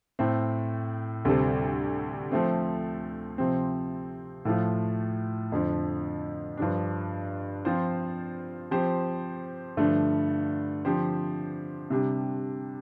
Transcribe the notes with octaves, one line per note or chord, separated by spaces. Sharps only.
A2 A3 C4
D2 C3 G3 C4 A4
F3 A3 C4
C3 F3 C4
A2 F3 A3 F4
F2 D3 F3
G2 F3 D4
F3 C4 F4 C5
F3 C4 G4 C5
G2 D3 F3 A3
D3 F3 C4 G4 C5
C3 G3 D4 G4